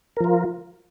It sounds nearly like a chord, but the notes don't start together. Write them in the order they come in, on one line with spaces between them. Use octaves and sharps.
A#4 F3 F4